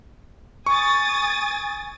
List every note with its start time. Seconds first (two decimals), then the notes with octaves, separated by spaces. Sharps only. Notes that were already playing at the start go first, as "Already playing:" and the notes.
0.66 G#5 C#6 D#6 A6